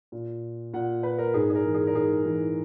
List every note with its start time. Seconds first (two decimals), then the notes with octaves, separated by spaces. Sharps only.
0.12 A#2
0.74 A#2 F#5
1.03 B4
1.18 A#4
1.34 G#2 G#4
1.50 G#4
1.55 A#4
1.65 E3
1.74 G#4
1.87 A#4
1.94 G#2 G#4
2.25 E3